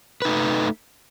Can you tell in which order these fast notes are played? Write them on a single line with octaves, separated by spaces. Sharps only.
B4 D#4 A3